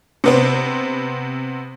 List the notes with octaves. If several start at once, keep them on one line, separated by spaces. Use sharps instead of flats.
C3 B3 C4